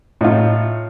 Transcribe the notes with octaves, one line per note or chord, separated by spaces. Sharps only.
A2 D#4 F4